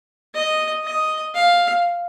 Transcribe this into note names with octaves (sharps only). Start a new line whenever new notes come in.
D#5
D#5
F5